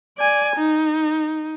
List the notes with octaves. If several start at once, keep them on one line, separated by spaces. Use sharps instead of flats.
D5 G#5
D#4